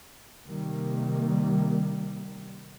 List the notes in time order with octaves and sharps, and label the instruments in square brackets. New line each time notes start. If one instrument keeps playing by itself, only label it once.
[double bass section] C3 D#3 G3 A#3